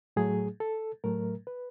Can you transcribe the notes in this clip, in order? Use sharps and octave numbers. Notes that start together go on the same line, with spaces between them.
A2 F#3 A3 G#4
A4
A2 F#3 A3 A#4
B4